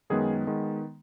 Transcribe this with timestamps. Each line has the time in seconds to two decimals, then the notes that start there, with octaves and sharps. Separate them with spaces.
0.10 F#2 D#3 G#3 B3 G#4
0.47 D#3 G#3 B3